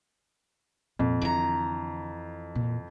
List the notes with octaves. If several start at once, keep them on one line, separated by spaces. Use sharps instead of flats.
F2 A#2
D3 E3 A#5
A#2